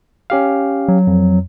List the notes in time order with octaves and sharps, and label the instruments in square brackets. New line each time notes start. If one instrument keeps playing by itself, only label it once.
[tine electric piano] C#4 G4 F5
[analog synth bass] F#3
[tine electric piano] F2